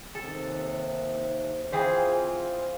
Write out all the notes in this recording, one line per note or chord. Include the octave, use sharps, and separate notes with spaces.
D#2 C3 A4
E3 C4 F4 G#4 C5